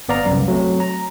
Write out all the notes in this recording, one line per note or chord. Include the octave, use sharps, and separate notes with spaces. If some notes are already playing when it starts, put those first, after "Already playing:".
G1 B3 D5 F5 A#5
C2 F#2
F#3 A3 C4
A#5